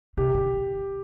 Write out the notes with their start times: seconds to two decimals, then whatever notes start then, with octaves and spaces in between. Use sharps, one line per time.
0.17 C3 G4
0.34 D3